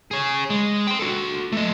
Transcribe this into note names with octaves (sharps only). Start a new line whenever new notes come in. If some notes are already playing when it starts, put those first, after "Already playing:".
G#4 C#5
G#3
G5 C6
F#4 A4
A3 D#5